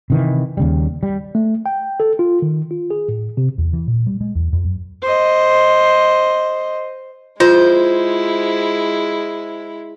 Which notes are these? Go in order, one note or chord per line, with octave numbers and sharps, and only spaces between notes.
C3 D#3 E3
D#2 C#3 G3
G3
A3
G5
A4
F4
D#3
F4
G#4
A2
C3
E2
E3
A#2
G3
G#3
E2
F2
F#2
C5 D#5
G#3 E4 F4 C5